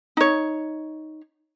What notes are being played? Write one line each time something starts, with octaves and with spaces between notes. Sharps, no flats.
D#4 C#5